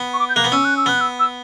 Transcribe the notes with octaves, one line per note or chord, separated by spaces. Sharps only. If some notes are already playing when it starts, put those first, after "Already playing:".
Already playing: B3
C#6
D6
G6
A#3 F#6
B3
C#4 E6
F#6
E6
B3 F#6
E6
E6